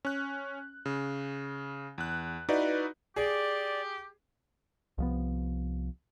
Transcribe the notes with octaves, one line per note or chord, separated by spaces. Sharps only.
C#4 F#6
C#3
E2 F#6
D#4 E4 F#4 B4 D5
G4 G#4 D5
C2 F3 B3